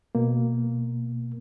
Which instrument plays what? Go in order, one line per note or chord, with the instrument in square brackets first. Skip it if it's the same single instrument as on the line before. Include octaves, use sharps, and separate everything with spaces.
[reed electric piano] B2 A#3